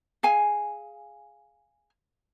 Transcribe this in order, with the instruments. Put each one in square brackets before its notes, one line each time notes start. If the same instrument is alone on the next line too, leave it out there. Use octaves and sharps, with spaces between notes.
[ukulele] G#4 F5 G#5